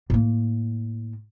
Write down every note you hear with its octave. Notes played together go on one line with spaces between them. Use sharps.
A2 A#3